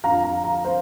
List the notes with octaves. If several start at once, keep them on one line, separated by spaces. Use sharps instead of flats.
F2 D3 F3 F5 A#5
F5 A#5
F5 A#5
C5 F5